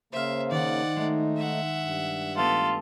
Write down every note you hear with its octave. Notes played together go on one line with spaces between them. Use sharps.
C#3 A#3 C5 E5 F5
D#3 D5 F#5
G#3 A3 D#4
E5 F#5
G2
A3 B3 F4 A4 B4